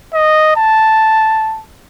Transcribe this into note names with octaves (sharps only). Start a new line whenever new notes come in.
D#5
A5